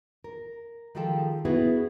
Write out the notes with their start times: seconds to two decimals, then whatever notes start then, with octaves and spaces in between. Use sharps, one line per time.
0.24 A#4
0.95 D#3 F3 G#3 G4 A4 G5
1.45 B3 C#4 E4 F#4 G#4 B4